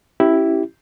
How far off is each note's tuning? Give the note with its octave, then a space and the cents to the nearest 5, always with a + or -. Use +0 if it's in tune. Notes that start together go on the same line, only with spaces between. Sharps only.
C#4 -25 E4 +0 G4 -15